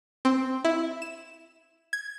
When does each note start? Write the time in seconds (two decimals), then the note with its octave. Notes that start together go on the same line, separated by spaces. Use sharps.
0.25 C4
0.65 E4
1.02 E7
1.93 G#6